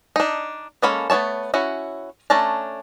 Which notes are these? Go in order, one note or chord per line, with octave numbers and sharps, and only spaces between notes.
D4 D#4
G#3 A#3 C#4 A4 B5
A3 B3 E4 C#5 A5
C#4 E4 F#4
A3 C#4 D4 A5 A#5